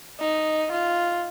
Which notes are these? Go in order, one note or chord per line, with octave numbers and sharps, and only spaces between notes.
D#4
F4